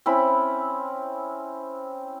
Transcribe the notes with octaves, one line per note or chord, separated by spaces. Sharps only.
C4 C#4 E4 B5